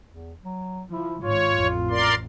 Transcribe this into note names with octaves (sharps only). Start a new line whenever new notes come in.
E2
F#3
F3 E4
G#1 G#2 F4 C#5
A1 F2
A#4 D5 C6